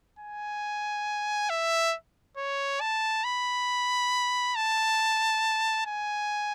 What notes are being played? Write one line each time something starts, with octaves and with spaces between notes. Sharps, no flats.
G#5
E5
C#5
A5
B5
A5
G#5